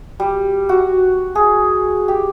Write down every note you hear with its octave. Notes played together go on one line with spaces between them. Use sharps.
G3
F#4
G#4
G4